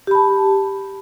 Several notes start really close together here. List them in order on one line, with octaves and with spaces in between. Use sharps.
G4 B5 A5